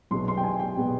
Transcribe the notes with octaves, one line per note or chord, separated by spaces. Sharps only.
B1 B2 G#3 B3 C6
C6
G5
G#5
G5
B2 G#3 B3